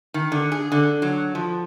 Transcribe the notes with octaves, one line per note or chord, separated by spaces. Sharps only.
D#3
D3
G#4
D3
F#3
F3